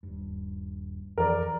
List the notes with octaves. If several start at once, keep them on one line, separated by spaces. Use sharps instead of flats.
D#1 G2
F2 E3 F3 A#4 D5